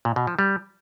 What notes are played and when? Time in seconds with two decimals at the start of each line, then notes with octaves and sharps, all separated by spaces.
0.05 A#2
0.16 B2
0.27 F3
0.39 G3